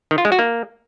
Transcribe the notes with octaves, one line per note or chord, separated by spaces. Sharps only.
D#3
F4
G#3
F#4
A#3